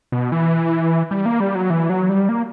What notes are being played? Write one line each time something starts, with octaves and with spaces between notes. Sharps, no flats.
B2
E3
G3
A#3
G3
F#3
E3
F#3
G3
A#3